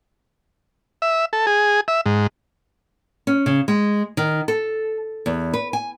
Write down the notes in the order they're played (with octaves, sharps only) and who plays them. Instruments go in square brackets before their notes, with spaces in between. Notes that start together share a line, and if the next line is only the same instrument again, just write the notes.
[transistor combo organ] E5
A4
G#4
E5
G#2
[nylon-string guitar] C#4
C#3
G#3
D#3
A4
E2
B4
G#5